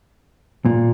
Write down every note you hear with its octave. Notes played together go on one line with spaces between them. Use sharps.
A#2